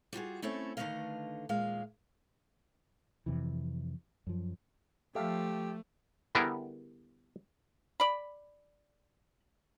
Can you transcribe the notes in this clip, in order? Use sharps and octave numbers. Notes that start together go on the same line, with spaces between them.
G3 F4 F#4 G#4
A3 C4 C#4 E4 A4 C#5
D3 D#3 A3 B4 D#5 F5
D#2 A#2 G#3 F5
F2 C3 E3
F#2 F3
F3 A3 G4 A4 E5 F5
D3 G3 B3 E4 G#4 A#4
D5 B5